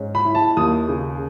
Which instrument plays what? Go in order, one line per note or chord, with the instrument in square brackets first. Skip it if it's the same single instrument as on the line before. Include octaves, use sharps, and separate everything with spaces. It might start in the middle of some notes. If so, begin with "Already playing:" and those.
Already playing: [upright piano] G#2 C#4
B5
E4
A5
D#2 D#6
C#3